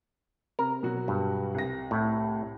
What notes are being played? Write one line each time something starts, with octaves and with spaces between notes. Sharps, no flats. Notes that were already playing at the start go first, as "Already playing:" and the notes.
C3 A#4
B2 F#3 F#4
G2
C2 A#6
A2 E4